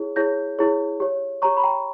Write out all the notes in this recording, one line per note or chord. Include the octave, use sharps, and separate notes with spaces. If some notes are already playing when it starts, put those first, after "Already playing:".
Already playing: E4 G#4 C#5
E4 G#4 C#5 G6 A#6
E4 G#4 C#5
G4 C#5
G4 C#5 A#5 C#6
B5
G5 A#5